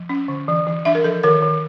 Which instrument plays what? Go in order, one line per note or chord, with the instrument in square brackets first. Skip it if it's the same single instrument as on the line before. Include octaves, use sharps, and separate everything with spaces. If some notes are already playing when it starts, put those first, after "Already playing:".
Already playing: [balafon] F3
C#4
D3
E3
E3
D4 E5
A#4
F3 A4
D#3 A#4
D#3